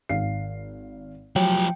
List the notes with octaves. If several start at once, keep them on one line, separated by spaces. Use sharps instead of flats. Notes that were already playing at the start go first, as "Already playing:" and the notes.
G#1 F5 C7
F3 F#3 G4 G5